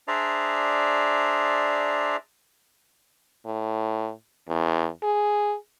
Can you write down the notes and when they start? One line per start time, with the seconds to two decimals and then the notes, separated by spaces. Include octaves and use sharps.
0.08 D4 G#4 C5 D5 E5 A#5
3.45 A2
4.48 E2
5.03 G#4